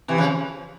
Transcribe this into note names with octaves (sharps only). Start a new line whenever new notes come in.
C3 E3
C#3 F3